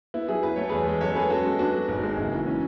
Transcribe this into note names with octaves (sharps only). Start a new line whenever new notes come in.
B3 E4
F#3 E4 G#4
F#2 B4
A3 C#5
E2 G#4 B4
G#3
F#2 A4 C#5
B3 G#4 B4
C#4 F#4 A4
G#3
B3 D4 F#4
F#3
G#1
G#3
F#1
E3
C#4